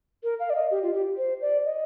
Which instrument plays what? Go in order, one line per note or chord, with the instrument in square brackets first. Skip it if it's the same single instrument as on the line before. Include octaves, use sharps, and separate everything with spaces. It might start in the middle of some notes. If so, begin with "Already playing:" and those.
[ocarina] A#4
F5
D5
D#5
G4
F4
G4
C5
D5
D#5